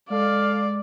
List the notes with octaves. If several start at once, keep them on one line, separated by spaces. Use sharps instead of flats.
G#3 A4 D5 F5